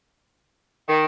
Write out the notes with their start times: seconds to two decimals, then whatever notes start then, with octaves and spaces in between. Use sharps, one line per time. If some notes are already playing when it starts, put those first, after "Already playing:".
0.88 D#3